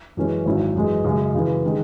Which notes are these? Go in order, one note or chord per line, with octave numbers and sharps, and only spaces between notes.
F#2 E3 G#3 C#4
G#1 G#2 F#3 C#4 E4
F#2 E3 G#3
F#2 C#3 G#3
F#2 C#3 E3
D#3 G#3